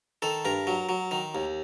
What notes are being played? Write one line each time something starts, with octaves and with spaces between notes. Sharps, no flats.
D#3 A4
G2 A#4
F#3
F#3
D#3
D#2